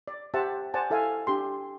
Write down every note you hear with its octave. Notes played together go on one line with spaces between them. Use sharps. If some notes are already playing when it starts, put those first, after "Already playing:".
D5
G4 C5 E5 F#5 A5
C5 D5 F#5 G#5 A5
E4 A4 E5 F5 G#5
D4 G4 C6